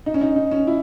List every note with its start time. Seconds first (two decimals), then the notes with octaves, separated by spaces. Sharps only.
0.06 D#4
0.14 C#4
0.21 D#4
0.36 D#4
0.51 C#4
0.67 E4